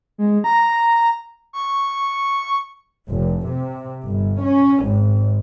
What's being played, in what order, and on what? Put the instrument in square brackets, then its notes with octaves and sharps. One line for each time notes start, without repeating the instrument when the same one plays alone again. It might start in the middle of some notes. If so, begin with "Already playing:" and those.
[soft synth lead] G#3
A#5
C#6
[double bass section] F1
C3
G1
C#4
G#1